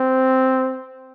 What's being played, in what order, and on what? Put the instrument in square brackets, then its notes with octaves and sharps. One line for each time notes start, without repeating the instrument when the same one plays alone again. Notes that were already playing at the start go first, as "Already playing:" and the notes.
Already playing: [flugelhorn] C4